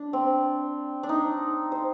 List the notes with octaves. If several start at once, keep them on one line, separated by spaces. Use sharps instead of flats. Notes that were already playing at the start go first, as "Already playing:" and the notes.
Already playing: D4
C4
D4
D#4
C5